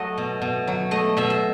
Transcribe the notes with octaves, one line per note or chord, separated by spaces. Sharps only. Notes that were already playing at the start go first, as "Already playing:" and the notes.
Already playing: F#3 A3 D#5 F#5
B2
B2
F#3
A3 D#5
B2 E5
E5